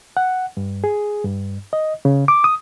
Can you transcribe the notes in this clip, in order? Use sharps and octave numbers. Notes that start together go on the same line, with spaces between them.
F#5
G2
G#4
G2
D#5
C#3
D6
D#6